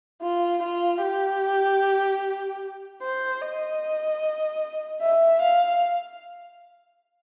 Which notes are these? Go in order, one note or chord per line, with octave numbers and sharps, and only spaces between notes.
F4
F4
G4
C5
D#5
E5
F5